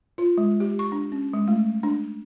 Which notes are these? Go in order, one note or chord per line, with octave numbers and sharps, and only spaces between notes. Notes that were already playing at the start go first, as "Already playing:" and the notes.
F4
G#3
G4
C#6
D4
C#4
G#3
A3
D4